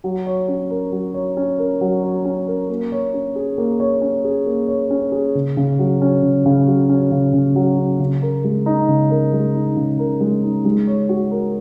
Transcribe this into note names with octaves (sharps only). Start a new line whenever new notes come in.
F#3
C#5
C#4
A#4
F#3
C#5
C#4
A#4
F#3
C#5
C#4
A#4
A#3
C#5
C#4
G#4
A#3
C#5
C#4
G#4
A#3
C#5
C#4
G#4
C#3
C#3
F#3
C#4
C#3
C#3
F#3
C#4
C#3
C#3
F#3
C#4
C#3
A#4
G#3
D#4
C#3
A#4
G#3
D#4
C#3
A#4
G#3
D#4
G#3
C#5
F#4
A#4